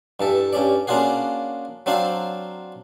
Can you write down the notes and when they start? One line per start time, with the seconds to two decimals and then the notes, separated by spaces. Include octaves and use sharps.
0.20 G2 E3 A4
0.53 G2 C#4 D5
0.87 A#3 C#4 D4 F4 F#4 G#4
1.86 F#3 C4 D4 F4 F5